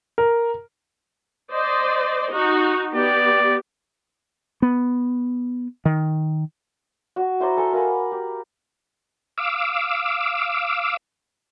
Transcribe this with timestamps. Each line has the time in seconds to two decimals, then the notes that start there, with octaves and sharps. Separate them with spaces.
0.18 A#4
1.51 C5 D5 D#5
2.32 D#4 F#4
2.94 B3 G4 D5
4.62 B3
5.85 D#3
7.16 F#4
7.40 E4 C5 D5 A#5
7.57 A4 G#5 C6
7.73 A#4 F5 G#5 B5
8.12 G4
9.38 F5 D6 E6